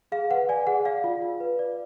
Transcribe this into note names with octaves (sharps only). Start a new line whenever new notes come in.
G#4 F5
B4 F#5
D5 G#5
G#4 F#5
D5 F5
F4
F4
B4
D5